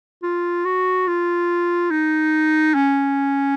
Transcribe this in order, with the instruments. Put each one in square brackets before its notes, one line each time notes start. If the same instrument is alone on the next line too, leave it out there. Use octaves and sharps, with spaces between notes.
[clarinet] F4
F#4
F4
D#4
C#4